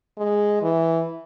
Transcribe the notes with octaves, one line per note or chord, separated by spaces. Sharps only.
G#3
E3